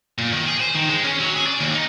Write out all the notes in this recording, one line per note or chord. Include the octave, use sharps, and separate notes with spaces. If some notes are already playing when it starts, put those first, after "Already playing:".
A#2
D#3
G#4
C5
D#3
G#3
C#4
F#3
G#4
D5
D#2
D#4